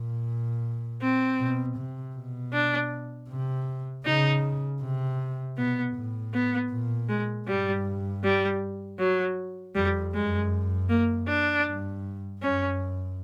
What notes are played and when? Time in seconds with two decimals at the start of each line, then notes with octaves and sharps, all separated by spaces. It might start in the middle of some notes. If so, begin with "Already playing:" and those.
Already playing: A#2
1.01 C4
1.39 B2
1.77 C3
2.15 B2
2.53 D4
3.29 C3
4.05 C#3 D#4
4.81 C3
5.57 B2 B3
5.95 A2
6.33 B3
6.71 A#2
7.09 G#3
7.47 G2 G3
8.24 G3
8.99 F#3
9.75 F2 G3
10.14 F#2 G#3
10.89 A#3
11.27 D4
11.65 G2
12.41 F#2 C#4